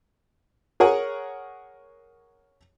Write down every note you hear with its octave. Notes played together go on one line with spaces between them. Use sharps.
G#4 A#4 C#5 F#5 G#5